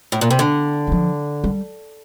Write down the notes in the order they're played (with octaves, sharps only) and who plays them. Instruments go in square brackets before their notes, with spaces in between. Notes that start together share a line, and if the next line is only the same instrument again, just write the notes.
[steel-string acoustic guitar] A2
A#2
C3
D3
[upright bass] D#3
F3
G3